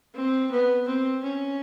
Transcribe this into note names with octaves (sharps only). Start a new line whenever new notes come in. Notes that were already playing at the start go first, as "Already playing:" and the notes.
C4
B3
C4
C#4